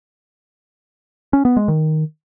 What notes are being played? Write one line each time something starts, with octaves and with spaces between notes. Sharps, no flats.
C#4
B3
G#3
D#3